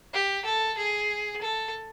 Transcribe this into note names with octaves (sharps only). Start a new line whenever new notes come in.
G4
A4
G#4
A4